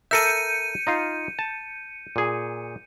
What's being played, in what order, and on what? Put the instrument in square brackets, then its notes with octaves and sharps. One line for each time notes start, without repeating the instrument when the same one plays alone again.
[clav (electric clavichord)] A4 A#4 E5 [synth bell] G6 C#7 D#7
[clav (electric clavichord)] D#4 F4 F5
A5
A#2 G#4